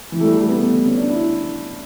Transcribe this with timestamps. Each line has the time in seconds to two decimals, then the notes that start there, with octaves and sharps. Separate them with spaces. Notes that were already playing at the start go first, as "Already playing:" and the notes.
0.12 E3
0.21 A3
0.25 G3
0.37 A3
0.49 B3
0.85 C#4
0.98 D4
1.10 E4